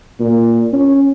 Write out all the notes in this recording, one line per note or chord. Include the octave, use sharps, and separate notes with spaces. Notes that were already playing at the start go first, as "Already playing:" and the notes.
A#2
C#4